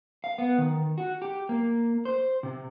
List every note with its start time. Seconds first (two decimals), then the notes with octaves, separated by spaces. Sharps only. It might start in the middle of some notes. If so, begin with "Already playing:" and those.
0.24 F5
0.38 B3
0.58 D#3
0.98 F#4
1.22 G4
1.49 A#3
2.05 C5
2.43 C3